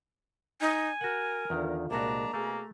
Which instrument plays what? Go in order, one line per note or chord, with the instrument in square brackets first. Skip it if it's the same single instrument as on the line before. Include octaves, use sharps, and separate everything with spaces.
[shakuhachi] D#4 [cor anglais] G#5
[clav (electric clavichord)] F#4 F#5 [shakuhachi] A#4
[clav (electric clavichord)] E2 D#3 [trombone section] D3 D4 F4
[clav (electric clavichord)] C2 A#2 F#4 [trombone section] G#3 A#3 [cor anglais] D4 [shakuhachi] A#5
[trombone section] B2 G#4 [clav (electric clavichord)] A3 [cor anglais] A#3